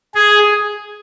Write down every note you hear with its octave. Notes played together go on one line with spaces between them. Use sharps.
G#4